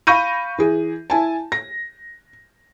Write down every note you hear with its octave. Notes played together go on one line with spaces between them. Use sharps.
F5 B5 C#6 G6 A#6 D#7
E3 G#4
E4 G#5 A5
A#6